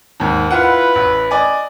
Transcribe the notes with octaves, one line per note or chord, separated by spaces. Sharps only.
D#2 G#2
E4 F4 B4 F#5
A1
D5 D#5 G#5